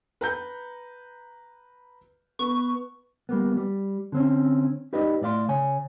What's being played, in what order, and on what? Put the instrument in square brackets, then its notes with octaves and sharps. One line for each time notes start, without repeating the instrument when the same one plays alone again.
[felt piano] B4 A#5 G6
[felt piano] B3 [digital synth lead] C#6
[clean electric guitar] G3 A#3 B3
G3
D3 C4 C#4
D#4 G4 B4 D5 D#5
A2 D5 F5 C6
C#3 C#5 G#5